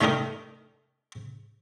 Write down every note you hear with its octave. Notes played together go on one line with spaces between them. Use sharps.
D#3 A3 D4 D#4 A#4